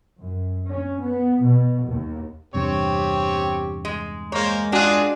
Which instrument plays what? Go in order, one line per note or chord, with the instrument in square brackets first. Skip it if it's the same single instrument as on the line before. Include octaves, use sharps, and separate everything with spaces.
[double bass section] F#2
C#4
B3
B2
D#2
[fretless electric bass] E2 G2 C3 [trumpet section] C4 C#5 [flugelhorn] G4
[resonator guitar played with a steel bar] G#3
[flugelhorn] G#3 [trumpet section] A#3 C5 A#5 [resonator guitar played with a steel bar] C#5
[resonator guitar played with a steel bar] D4 F#4 [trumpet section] F4 G#4